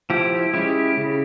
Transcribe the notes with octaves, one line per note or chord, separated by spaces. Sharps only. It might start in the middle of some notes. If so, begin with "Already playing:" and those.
F3 E4 G4
G#3 C#4 E4 G4
C#3